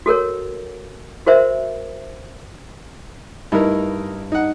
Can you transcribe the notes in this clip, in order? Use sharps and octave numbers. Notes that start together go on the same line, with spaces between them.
F#4 A4 A#4 C#5
F#4 A#4 C5 E5
G2 D#4 E4 A#4
D#4 F#5